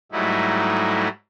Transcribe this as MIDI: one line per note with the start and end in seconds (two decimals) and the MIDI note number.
0.12 1.08 44
0.12 1.08 54
0.12 1.08 55
0.12 1.08 57
0.12 1.08 63
0.12 1.08 64